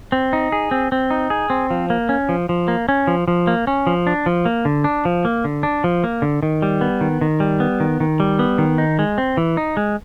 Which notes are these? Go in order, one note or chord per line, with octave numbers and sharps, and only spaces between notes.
C4
D#4
G#4
C4
C4
D#4
G#4
C4
F3
A#3
C#4
F3
F3
A#3
C#4
F3
F3
A#3
C#4
F3
D4
F3
A#3
D3
D4
F3
A#3
D3
D4
F3
A#3
D3
D#3
G3
B3
D#3
D#3
G3
B3
D#3
D#3
G3
B3
D#3
D#4
G#3
C4
E3
D#4
G#3